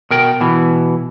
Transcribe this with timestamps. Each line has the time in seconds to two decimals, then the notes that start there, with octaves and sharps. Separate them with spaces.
0.11 B2 A#4 G5
0.41 B2 E3